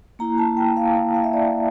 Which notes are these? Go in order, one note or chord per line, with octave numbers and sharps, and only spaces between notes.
A#3 E4 A#5
A5
G5
F5
F5
E5
D5